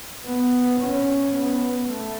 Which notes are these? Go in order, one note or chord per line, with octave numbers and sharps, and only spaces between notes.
B3
C#4
B3
A3